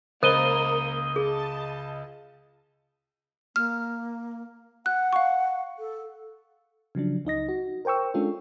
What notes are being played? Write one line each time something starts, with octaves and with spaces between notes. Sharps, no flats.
C#2 A#3 C5 D#5 B5 D#6 D#7 G7
G#4 A5
A#3 F6
F#5 F#6
F5 C#6
A4
C#3 F3 F#3 D4
C#2 D#4 D#5 A#6
F#4
A#4 C5 G5 C#6 E6
G#3 C#4 D4 F4 A4